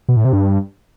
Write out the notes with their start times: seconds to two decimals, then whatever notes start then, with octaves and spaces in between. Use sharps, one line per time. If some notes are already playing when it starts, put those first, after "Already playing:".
0.09 B2
0.17 A2
0.25 C3
0.33 G2